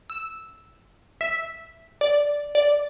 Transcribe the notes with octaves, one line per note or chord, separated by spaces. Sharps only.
E6
E5
D5
D5